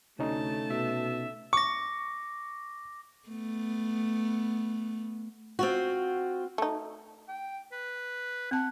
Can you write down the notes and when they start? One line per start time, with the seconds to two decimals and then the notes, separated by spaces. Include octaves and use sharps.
0.19 D2 C3 A3 C#4 D#4 A5
0.70 B2 E5
1.53 C#6 D6 A#6
3.29 A3 B3
5.59 C4 F4 F#4
6.58 A3 D#4
7.28 G5
7.72 B4
8.51 C4 F#5 A5